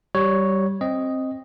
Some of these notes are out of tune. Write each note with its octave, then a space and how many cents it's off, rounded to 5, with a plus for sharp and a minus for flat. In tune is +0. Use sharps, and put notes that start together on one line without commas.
G3 -15 C#5 +0
C4 +15 D#5 +0